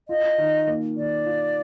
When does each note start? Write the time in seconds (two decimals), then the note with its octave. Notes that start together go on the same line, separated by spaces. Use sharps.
0.08 F4 D#5
0.38 D#3
0.67 A#3
0.97 D#3 D5
1.26 F4